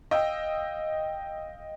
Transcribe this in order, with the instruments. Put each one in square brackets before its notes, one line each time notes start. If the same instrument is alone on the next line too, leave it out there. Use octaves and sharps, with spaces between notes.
[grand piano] D#5 F5 G5 E6